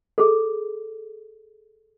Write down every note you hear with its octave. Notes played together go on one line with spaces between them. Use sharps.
G#4 A4